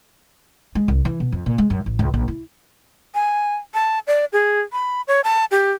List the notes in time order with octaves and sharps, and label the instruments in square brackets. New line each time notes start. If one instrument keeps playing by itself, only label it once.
[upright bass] G#3
C2
E3
B2
F2
A#2
G#3
F#2
A1
C#2
A#1
E4
[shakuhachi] G#5
A5
D5
G#4
B5
C#5
A5
G4